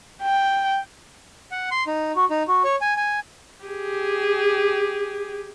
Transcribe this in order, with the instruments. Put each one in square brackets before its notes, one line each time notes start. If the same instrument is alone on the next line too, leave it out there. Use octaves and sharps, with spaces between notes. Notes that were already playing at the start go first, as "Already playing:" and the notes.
[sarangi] G5
[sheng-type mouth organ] F#5
C6
D#4
F#4
D#4
F#4
C#5
G#5
G#5
[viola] G4 G#4